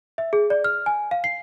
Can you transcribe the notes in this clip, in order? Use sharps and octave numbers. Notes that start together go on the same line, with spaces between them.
E5
G#4
D5
F6
G#5
F5
C7